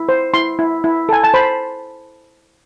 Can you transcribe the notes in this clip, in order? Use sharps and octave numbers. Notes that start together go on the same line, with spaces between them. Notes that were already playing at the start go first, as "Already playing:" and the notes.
Already playing: E4
C5
E4 C6
E4
E4
A4 G#5
A5
C5 B5